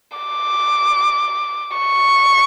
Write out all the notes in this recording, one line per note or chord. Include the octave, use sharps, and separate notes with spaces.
D6
C#6